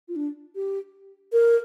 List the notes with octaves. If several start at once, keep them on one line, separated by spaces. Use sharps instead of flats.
F4
D4
G4
A#4